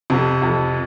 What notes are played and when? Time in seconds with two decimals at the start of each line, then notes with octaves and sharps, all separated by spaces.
0.10 C2 F2 C3
0.42 F2